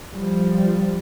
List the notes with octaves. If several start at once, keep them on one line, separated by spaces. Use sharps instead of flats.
F3 G3